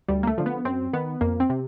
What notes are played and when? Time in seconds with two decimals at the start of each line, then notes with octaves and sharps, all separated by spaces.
0.08 D2 G3
0.23 A#3
0.27 A3
0.38 D3 F3
0.46 B3
0.65 F#2 C4
0.93 D#3 B3
1.21 F2 A#3
1.40 C4
1.50 C3